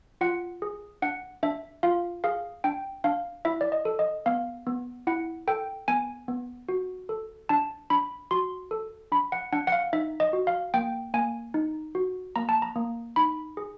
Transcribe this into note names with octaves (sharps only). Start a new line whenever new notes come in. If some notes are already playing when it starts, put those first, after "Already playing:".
F4 F#5
G#4
D4 F#5
D4 E5
F4 F5
G#4 F5
D4 G5
D4 F5
E4 E5
D5
D#5
A4
D#5
B3 F5
B3
E4 F#5
A4 G5
B3 G#5
B3
F#4
A4
D4 A5
D4 B5
F#4 C6
A4
D4 B5
F#5
D4 F#5
F#5
F5
D#4 E5
D#5
F#4
F5
A#3 G5
A#3 G#5
D#4
F#4
A#3 A#5
A5
A#5
A#3
D#4 B5
G#4